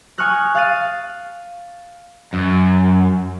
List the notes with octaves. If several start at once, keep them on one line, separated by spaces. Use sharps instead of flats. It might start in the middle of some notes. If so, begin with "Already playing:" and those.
G#5 C#6 D#6 F6 F#6 A#6
F5 F6 F#6 A6 C7 D#7
F#2